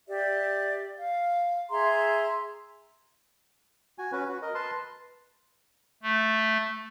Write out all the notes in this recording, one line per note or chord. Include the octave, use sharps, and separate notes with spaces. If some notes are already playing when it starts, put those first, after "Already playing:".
G4 D5 E5
F5
G#4 E5 A#5 C6
F#4 G#5
C#4 F#4 B4
F#4
A#4 D#5
B4 A5 C6
A3